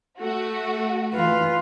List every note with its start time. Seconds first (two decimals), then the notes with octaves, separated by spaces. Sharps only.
0.20 A3 F#4
1.14 E3 F4 B4 F5